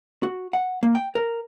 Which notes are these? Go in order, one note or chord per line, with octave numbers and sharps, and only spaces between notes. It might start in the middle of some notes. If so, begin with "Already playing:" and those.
F#4
F#5
A#3
G5
A#4